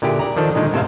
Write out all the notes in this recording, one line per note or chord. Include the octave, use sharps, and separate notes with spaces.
A#2 D3 E4 G4 G#4
D5 A#5
D#3 F3 D4 A4
A#2 D3 D#3 G#3 D#4
A2 C3 A4 C5 E5 F5